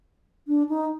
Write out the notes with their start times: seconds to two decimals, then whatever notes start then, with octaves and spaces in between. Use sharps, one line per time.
0.48 D4
0.69 D#4